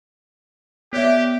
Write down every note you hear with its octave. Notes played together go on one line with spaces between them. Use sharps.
B3 G4 C#5 D5 E5